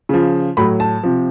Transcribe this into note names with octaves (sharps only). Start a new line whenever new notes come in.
C#3 F3
A2 F#3 B5
A5
C3 F3